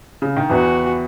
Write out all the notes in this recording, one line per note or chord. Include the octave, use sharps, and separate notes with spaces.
C#3
D#3
E2 E3 F#4